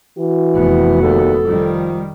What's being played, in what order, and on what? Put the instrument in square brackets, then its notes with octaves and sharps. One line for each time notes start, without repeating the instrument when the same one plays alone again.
[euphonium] E3 [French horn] F#4
[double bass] F1 B3
[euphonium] D#2 [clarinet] A4
[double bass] D#3 G3 [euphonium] F3